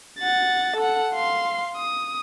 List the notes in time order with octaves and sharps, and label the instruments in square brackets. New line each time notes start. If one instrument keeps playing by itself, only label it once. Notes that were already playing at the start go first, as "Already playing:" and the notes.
[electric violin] F#5 A6
A4 F#5
F5 C6
D#6